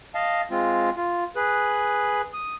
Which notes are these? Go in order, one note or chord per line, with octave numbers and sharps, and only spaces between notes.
D#5 F5 A5
G#3 C4 F4
F4
G#4 B4 F#6
D#6